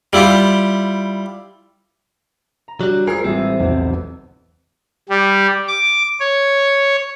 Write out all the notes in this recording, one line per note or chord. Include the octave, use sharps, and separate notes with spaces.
G3 E4 F4 G4
A#5
F#3 G3 D4 F#4
G#3 F4 G#4 A#4 C5 D#6 E6 G#6
A1 G3 C4 E5 D#6
B1 E2 C3
G3
D6
C#5